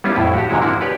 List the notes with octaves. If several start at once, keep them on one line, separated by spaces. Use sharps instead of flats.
G3 B3 C#4 E4 F4
F2 A2 E4
F#4 G4
G#2 C3 D#3 G#3 E4 F#4
F3 A#3 D4 E4 F#4
G4 B4 C#5 D5